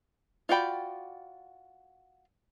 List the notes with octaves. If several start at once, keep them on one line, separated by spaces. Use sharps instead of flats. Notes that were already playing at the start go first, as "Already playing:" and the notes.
F4 F#4 D5 G5 B5